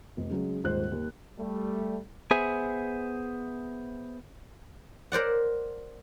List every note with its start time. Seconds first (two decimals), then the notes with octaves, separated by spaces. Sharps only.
0.17 F1
0.30 C#3 F#3 G#3 G#4
0.64 D#1 G#2 C5 F#6
0.92 D#2
1.38 G3 A3
2.31 B3 G#4 C5 E5 G#5
5.12 A#4 C5 D5 F#5